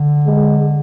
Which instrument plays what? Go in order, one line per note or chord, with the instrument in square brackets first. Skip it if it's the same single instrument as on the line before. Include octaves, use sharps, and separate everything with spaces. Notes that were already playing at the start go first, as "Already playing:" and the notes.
Already playing: [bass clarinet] D3
[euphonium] G#3